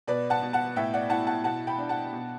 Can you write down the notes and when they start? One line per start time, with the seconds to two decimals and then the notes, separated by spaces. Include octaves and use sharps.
0.08 B2 B4 D5
0.30 F#5 A5
0.42 B2
0.53 F#5 A5
0.76 A2 E5 G5
0.94 D5 F#5
1.10 E4 F#5 A5
1.27 F#5 A5
1.44 B2 F#5 A5
1.67 G5 B5
1.78 D4
1.89 F#5 A5
2.12 B2